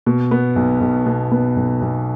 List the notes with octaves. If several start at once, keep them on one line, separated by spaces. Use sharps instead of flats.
B2
B3
B1
B1
B2
B3
B1
B1